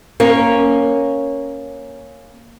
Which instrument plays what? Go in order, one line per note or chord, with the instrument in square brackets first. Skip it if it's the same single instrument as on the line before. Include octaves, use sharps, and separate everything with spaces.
[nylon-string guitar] A#3 C#4